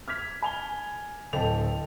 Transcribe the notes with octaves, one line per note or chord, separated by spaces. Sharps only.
F6 G#6 B6 F7
G#5 F7 G7
D1 A4 D#5 G5 A5 F7